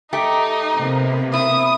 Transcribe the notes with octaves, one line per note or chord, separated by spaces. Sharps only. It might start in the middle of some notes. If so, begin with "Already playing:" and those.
A3 D#4 G4
C3 A#3 B3
E4 D#6